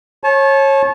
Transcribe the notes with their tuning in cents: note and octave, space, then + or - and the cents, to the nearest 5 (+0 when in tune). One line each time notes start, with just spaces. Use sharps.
C#5 -25 A5 -30